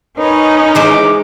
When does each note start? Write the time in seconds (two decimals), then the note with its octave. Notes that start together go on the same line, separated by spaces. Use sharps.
0.18 C#4 D#4 A#4 B4 C#5 D#5
0.75 E3 G#3 C5 E5 D6